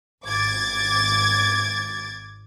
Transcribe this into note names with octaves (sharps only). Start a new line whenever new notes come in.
G#1 D6 G#6 A6